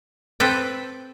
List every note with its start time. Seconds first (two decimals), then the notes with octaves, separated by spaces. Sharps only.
0.40 C4 A4 B4 G5